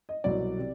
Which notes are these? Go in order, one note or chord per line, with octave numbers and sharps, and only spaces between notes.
D#5
C2 B2 F#3 D5
C3